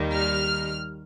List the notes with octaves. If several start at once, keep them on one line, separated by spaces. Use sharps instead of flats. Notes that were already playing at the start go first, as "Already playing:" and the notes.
Already playing: D#2 D#3 G3
F6